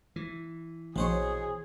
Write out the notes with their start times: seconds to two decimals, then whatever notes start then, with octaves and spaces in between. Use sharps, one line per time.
0.16 E3
0.96 A#1 B2 G#4 C5 C#5